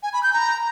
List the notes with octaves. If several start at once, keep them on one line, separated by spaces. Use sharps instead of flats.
G#5
B5
G6
A#5